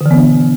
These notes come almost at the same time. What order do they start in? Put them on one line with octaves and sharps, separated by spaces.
D3 E3 B3 D4 B2